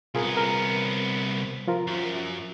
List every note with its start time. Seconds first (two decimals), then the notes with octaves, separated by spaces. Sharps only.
0.15 C2 B3 F4 G#4 A#4
0.37 A#4
1.68 F3 F4 A#4
1.87 F#2